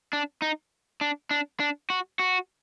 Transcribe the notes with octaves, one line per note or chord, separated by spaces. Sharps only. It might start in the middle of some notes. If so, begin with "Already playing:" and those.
D4
D#4
D4
D4
D4
F#4
F#4